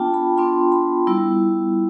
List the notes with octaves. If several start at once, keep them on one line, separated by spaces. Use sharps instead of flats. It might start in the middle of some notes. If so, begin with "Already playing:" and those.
Already playing: B3 D4 F4 G5 A5
B5
B3 D4 F4 C6
B5
G3 B3 E4